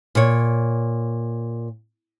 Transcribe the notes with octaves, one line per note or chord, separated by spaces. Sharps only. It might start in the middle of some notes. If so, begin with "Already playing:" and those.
A#2 C#5